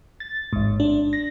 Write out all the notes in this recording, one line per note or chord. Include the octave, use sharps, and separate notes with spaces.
A6
A1 G#2
D4
A#6